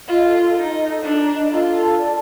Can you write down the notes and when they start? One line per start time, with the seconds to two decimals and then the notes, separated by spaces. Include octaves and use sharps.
0.08 F4 D#5
0.24 A4
0.40 A4
0.56 D#4 A#5
0.71 D#5
0.87 A4
1.03 D4 A4
1.19 A#5
1.35 D#5
1.50 F4 A4
1.67 A4
1.82 A5
1.97 D5